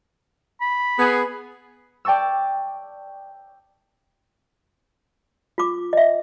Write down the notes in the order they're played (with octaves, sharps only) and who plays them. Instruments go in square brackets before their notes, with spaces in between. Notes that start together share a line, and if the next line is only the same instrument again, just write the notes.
[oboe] B5
[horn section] B3 G#4
[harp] D5 G5 A5 C#6 E6
[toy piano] F4 D6
D#5 E5